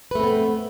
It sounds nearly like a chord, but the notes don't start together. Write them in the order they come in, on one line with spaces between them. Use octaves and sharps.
B4 A3 C4 B3